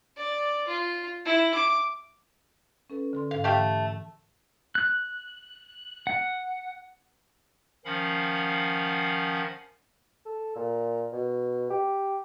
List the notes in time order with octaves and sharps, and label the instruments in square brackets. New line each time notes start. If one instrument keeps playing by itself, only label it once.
[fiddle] D5
F4
E4
D6
[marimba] C#4 A4 B4
D3 A4 C6
[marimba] G#2 A4 [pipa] F5
[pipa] A3 G4 F5 [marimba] G5
[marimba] E3
[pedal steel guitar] F#6
F#5
[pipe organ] D#3 F3 C#4 F5 F#5 B5
[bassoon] A4
A#2
B2
G4